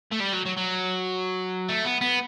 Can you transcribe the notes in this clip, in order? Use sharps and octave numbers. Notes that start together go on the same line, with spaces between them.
A3
G3
F#3
F#3
F#3
A3
B3
B3